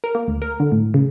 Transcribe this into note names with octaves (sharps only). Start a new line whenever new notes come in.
A#4
A#3
D2
A#4
D3
A2
C#3